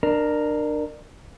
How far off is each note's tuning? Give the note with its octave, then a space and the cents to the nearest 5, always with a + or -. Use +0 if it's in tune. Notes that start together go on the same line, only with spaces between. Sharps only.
D4 +30 A#4 +0